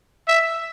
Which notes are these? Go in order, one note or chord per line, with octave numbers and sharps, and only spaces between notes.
E5